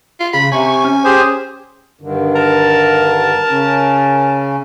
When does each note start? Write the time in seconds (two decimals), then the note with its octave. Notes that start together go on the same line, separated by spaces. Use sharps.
0.20 F4
0.33 C#3 B5
0.52 C3 G#5 C#6
0.84 C#4
1.04 G4 G#4 C5
2.01 G2 D3 D#3
2.35 A#4 A5
3.50 C#3 C#4